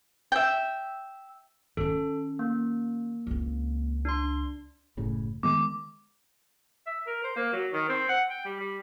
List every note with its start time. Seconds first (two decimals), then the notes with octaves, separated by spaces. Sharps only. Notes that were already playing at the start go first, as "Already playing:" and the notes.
0.32 E5 G5
1.77 D#3 C#4 A4
2.39 A#3
3.27 C#2 C4
4.05 D4 C6
4.97 F#1 A2 C#3
5.43 D#3 G#3 B3 D6
6.87 E5
7.07 A#4
7.24 C5
7.36 A#3
7.53 F#3
7.73 D#3
7.89 C4
8.09 F#5
8.30 G5
8.45 G3
8.60 G3